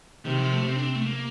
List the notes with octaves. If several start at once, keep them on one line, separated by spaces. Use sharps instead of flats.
C3 D#3
F3
A3
C3 C4
D4
C4
A3
A#3